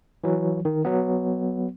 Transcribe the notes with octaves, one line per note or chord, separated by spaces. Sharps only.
E3 F#3
D#3
F#3 B3